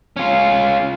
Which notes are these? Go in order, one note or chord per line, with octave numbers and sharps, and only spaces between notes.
C#4 F4